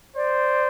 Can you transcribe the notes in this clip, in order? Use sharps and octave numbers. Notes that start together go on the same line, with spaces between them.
C5 D5